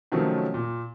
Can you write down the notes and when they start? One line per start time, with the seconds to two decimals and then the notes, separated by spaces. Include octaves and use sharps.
0.12 C3 D#3 F3 F#3 A3 C#4
0.54 A#2